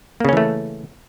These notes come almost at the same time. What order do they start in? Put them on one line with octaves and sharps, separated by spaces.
A#3 C#3 C#4 E3 A3